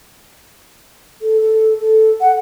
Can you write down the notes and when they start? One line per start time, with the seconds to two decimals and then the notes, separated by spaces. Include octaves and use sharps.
1.22 A4
1.41 A4
1.80 A4
2.21 F#5